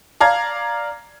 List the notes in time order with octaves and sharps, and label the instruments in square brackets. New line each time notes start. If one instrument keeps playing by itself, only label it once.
[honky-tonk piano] D5 F5 A#5 G#6